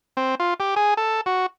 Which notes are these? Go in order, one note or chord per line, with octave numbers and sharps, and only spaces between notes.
C4
F4
G4
G#4
A4
F#4